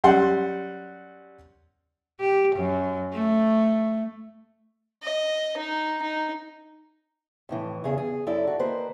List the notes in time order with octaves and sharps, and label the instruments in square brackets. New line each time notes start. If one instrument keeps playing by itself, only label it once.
[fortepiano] F#2 G3 F#5 C6
[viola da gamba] G4
F#2
A3
[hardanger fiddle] D#5
D#4
D#4
[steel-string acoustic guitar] F2 A2 E3
E2 C#3 G#4
G#4
F#2 E4 A4 D5
F#4
D#3 A#3 B4 C5